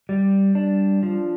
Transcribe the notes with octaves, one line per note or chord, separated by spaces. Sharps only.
G3
D4
F3